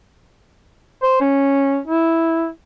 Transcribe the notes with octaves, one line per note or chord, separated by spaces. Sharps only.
C5
C#4
E4